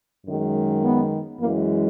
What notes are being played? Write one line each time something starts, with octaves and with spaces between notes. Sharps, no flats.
F#2 D#3 G#3
B3
F#2 E3 G#3 A#3